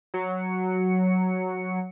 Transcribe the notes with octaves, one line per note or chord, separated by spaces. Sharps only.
F#3 C#7